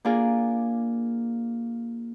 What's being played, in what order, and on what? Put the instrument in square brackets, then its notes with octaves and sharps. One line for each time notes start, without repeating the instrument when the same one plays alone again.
[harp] A#3 D4 F4 G#4 A#4